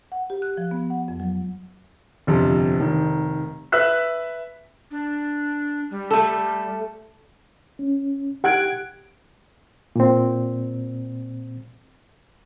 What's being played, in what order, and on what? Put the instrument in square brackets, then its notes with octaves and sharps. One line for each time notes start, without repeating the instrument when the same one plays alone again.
[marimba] F#5
G4
F#6
F3
B3
F#5
F2
F#3
[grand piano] G1 F2 C3
F1 D#3
B4 E5 E6 F#6 B6
[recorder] D4
G3
[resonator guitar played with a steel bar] A3 A4
[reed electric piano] C#4
[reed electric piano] G4 F#6 [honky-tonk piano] F#5 G#6 D7
[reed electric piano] A#2 C4